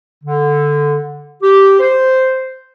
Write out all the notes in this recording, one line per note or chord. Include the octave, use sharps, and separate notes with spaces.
D3
G4
C5